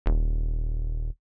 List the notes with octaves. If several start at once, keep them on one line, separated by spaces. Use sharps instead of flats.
D#1